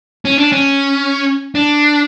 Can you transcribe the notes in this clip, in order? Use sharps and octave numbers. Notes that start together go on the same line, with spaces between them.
C#4
D4
C#4
D4